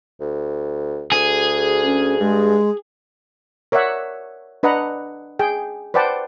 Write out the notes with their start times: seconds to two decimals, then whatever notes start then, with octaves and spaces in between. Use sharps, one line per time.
0.20 D2
1.12 D2 G#4
1.84 C#4
2.20 G2 G#3
3.72 A#4 C#5 D5 E5 F#5
4.63 D4 B4 D#5 F#5 A#5
5.39 G#4 G5
5.94 B4 C5 D5 F#5 G5 A5